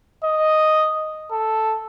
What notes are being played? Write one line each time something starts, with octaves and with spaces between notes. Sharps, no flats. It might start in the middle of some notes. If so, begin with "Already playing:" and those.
D#5
A4